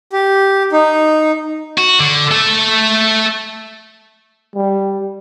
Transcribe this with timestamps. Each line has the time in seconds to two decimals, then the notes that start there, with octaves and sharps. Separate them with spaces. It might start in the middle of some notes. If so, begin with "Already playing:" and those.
0.13 G4
0.72 D#4
1.78 F#4
2.00 D3
2.31 A3 A4
4.55 G3